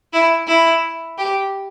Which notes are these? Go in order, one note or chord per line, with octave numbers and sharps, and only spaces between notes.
E4
E4
G4